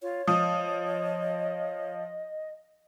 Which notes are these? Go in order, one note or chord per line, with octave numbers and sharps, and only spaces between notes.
F4 C#5
F3 D#5 D#6